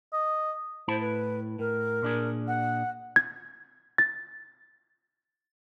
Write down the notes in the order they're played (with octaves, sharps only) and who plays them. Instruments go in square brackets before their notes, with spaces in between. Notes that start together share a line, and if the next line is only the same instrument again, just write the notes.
[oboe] D#5
[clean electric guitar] A2 E4 A5 [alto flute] C5
[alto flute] B4
[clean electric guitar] A2 [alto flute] A#4
[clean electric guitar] A#2 D4 G#4
[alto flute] F#5
[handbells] G#6
A6